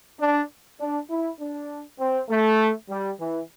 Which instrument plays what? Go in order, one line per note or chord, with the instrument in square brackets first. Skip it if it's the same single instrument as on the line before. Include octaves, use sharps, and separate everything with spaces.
[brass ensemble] D4
D4
E4
D4
C4
A3
G3
E3